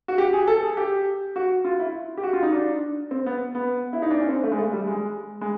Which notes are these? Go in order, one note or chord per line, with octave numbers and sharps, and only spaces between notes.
F#4
G4
G#4
A4
G#4
G4
F#4
F4
E4
G4
F#4
F4
D#4
D4
C4
B3
B3
E4
D#4
D4
C#4
C4
A3
G#3
A3
G3
G#3
G#3